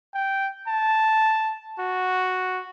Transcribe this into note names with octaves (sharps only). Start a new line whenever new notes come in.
G5
A5
F#4